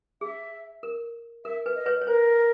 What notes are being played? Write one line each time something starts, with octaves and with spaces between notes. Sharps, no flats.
G#4 E5
A#4
A#4 E5
B4
D#5
B4 C#5
C#5
A#4 C5